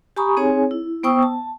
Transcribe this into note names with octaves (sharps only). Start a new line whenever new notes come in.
G4 G#5 A#5 B5 C#6 D#6
C4 D#4 G#4 C#5 G#5
E4
B3 C5 G5 C#6 D#6 E6
A5